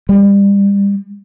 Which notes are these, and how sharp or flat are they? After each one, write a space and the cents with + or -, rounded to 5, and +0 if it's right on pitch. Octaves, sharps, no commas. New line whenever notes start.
G3 +30